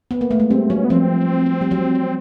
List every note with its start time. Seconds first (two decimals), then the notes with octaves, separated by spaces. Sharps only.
0.11 B3
0.21 A#3
0.31 A3
0.40 G#3
0.50 G3 C4
0.70 F#3 C#4
0.85 B3
0.90 F3 C4
1.61 G3
1.71 F#3